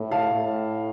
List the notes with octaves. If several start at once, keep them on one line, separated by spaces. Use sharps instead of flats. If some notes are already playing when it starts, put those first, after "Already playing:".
Already playing: A2
F5 A5
A2